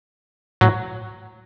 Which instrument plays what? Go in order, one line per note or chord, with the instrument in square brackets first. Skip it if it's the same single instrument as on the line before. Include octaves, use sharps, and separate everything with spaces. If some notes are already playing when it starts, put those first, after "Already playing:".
[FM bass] A2 [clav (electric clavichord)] F#3